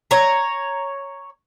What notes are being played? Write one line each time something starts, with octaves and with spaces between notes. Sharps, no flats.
C#5 A#5